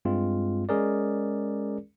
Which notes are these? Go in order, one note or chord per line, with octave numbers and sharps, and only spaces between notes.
G2 G#3 C4 F4
G#3 C#4 G#4 A#4 D5